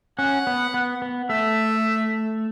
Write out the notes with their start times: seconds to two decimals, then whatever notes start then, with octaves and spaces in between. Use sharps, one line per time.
0.19 C#4 F#5
0.47 B3
0.74 B3
1.02 B3
1.29 A3 E5